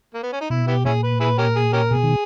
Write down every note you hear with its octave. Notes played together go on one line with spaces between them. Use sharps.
A#3
B3
C#4
D#4
B2 E4
B3 E4 G4
A#2 C#4 E4 G#4
B4
E4 G#4 B4
C#4 G4 A#4
G#4
C#4 G4 A#4
B2 G#4
D#3